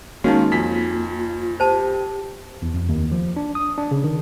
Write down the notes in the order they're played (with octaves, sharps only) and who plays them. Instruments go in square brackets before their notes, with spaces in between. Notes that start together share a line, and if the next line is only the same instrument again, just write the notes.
[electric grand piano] D#3 G#3 C#4 [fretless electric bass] A#3 [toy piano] D#4 F#4 [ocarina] F5
[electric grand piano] F2 G#5 B6 [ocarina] F4
[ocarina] G4 [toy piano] C5 A5
[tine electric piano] E2
F2
D#2
F3
D4
D#6
D4
C#3
D#3